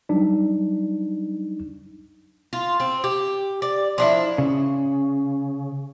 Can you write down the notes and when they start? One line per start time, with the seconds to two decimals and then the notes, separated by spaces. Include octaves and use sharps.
0.09 F#3 G3 D4 D#4
2.53 F4
2.80 C4
3.04 G4
3.62 D5
3.98 F3 D4 E4
4.38 C#3